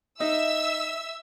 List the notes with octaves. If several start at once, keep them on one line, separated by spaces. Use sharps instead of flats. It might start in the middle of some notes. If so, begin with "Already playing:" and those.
D#4 E5 E6